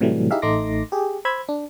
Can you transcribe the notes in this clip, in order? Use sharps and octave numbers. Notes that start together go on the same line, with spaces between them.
A2 C3 E3 F#3 G3 A3
D#4 E4 G4 G#4 E5 F5
A1 A3 D#4 C6 D6 A#6
G4 G#4
C5 B5 E6 G#6
D4